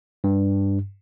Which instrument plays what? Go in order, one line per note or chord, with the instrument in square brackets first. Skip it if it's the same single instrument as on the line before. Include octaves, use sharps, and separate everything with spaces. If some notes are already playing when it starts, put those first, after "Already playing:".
[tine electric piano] G2